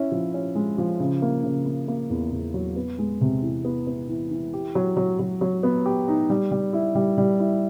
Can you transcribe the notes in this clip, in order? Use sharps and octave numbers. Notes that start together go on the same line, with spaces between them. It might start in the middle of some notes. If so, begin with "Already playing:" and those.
Already playing: C#4 E4
F3
C#4
G#3
F3
C#3
A#3
C#3
A#3
A#3
E2
E2
F#3
B3
G#3
C3
E3
B3
B3
E3
E3
G4
F#3
F#3
F#3
F#3
B3
G4
D#4
G3
G3
E4
G3
G3
E4